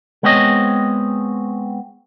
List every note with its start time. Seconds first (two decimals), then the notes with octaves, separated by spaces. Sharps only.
0.23 G#3 B3 C4 C#5 D#5